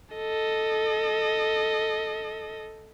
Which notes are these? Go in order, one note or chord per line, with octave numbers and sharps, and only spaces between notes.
A4 D#5